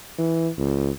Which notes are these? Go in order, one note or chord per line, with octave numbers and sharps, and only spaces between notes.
E3
C#2